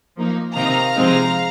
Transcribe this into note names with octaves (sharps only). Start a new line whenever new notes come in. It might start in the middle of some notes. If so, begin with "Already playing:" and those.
F3 A#3 D#4
C3 D#3 C4 D#4 F5 A#5
C3 F3 G#3 C4 D#4